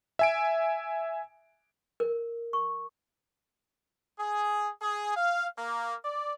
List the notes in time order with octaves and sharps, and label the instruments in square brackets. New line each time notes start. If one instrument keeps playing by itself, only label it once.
[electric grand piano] E5 G#5 D7
[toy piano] A#4
C#6
[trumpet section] G#4
G#4
F5
A#3
D5